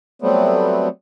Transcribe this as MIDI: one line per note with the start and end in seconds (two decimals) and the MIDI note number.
0.22 0.88 54
0.22 0.88 55
0.22 0.88 57
0.22 0.88 59
0.22 0.88 60